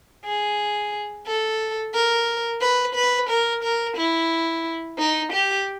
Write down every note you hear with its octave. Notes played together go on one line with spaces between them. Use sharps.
G#4
A4
A#4
B4
B4
A#4
A#4
E4
D#4
G4